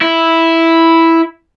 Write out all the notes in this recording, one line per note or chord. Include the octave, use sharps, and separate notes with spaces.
E4